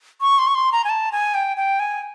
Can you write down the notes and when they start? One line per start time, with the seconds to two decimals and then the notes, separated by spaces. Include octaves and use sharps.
0.21 C#6
0.38 C6
0.47 C#6
0.55 C6
0.72 A#5
0.84 G#5
0.89 A5
1.12 G#5
1.34 G5
1.57 G5
1.79 G#5